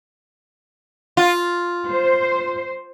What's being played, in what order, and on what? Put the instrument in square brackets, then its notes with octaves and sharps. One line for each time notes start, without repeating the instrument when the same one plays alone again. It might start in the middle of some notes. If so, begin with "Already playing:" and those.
[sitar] F4
[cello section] C5